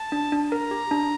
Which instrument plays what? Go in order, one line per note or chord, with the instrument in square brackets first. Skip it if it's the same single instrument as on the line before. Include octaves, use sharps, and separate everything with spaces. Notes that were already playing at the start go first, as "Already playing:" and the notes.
Already playing: [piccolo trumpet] A5
[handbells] D4
D4
[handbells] A#4 [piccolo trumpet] A#5
[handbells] G4
D4